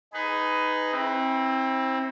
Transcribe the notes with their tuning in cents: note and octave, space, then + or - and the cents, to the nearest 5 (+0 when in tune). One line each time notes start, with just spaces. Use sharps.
D#4 +0 G#4 +0 B4 +20
C4 +20 E4 -30